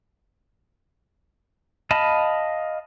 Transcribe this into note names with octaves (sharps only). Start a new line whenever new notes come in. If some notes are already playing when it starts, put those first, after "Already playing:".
D#5 F5 A5 B5